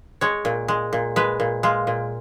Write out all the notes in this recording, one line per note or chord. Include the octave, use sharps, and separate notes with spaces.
G#3 C#5
A#2
G#3
A#2
G#3 B4
A#2
G#3 F4
A#2